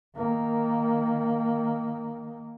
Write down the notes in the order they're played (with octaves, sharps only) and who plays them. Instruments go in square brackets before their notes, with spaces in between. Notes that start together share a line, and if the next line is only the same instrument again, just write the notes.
[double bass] D#3 A#3